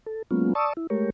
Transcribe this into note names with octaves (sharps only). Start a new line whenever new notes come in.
A4
F#3 G#3 A#3 B3 C#4 F4
D5 A5 C#6 D#6 E6
E4
G#3 A3 G4 A#4 C#5